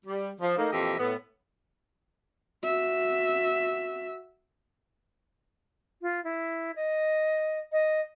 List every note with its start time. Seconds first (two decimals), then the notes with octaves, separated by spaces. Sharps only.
0.05 G3
0.40 F3
0.57 A3 A#3 D#4
0.72 F2 A#2 E3 G4 D#5 E5
0.98 A2 B3
2.64 F#4 E5
6.02 F4
6.24 E4
6.76 D#5
7.72 D#5